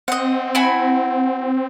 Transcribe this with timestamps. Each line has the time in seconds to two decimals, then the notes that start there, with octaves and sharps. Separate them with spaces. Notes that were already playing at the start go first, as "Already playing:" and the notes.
0.08 C4 D#5 F#5
0.55 E4 F#4 G#5